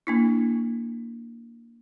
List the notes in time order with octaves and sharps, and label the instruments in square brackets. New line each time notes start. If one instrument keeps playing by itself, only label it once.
[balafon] A#3 D4 E4